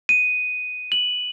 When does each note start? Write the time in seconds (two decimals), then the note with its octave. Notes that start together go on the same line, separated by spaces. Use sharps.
0.09 D#7
0.92 F#7